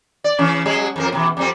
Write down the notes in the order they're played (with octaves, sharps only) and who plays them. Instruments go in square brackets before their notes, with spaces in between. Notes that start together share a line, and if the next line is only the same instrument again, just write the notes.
[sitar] D5
C#3 E3 C#4
F#3 G3 G#4
F2 F3 A#4
B2 E3
F2 G3 C4